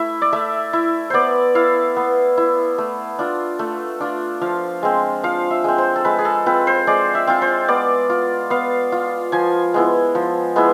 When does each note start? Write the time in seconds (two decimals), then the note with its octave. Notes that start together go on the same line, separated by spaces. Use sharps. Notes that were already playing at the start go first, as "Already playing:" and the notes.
Already playing: A3 E4 E5
0.22 D5
0.33 A3 E5
0.73 E4
1.10 B3 C5 D5
1.55 E4 F5
1.97 B3
2.37 E4
2.78 A3
3.19 D4 F4
3.59 A3
4.00 D4 F4
4.41 F3 F5
4.83 G#3 C4
5.23 F3 F5
5.51 E5
5.64 G#3 C4
5.78 C5
5.96 A4
6.05 G#3 B4
6.18 G#4
6.25 A4
6.46 C4 F4 B4
6.67 C5
6.87 G#3 D5
7.15 E5
7.27 C4 F4
7.42 C5
7.68 B3 D5
8.10 F4
8.50 B3 F5
8.92 F4
9.32 F3 G#5
9.74 G#3 B3 E4
10.15 F3
10.56 G#3 B3 E4